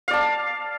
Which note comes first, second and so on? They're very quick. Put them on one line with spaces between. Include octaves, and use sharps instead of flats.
F5 D5 A5